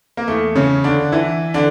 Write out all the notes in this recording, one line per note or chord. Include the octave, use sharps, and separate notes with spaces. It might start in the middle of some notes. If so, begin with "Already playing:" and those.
A#3
E2 E3 A3
C#3 C#4
D3 D4
E3 E4
D3 D4